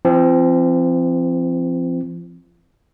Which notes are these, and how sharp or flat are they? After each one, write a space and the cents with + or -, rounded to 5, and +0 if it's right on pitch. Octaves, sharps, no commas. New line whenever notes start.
F3 -35 C4 +0